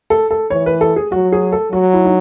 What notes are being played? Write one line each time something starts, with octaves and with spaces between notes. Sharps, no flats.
A4
A4
E3 C#5
B4
A4
G#4
F#3 F#4
G#4
A4
F#3 F#4
E4
D#4